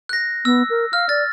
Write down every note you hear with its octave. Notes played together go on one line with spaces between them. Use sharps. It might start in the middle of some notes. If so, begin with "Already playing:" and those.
F#6 A#6
B3 E6
A#4
F5 F6
D5 A6